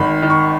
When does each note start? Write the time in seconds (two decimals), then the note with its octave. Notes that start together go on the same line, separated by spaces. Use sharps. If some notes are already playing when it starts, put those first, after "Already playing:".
Already playing: G#1 D#3 B5
0.22 D#3
0.30 C#6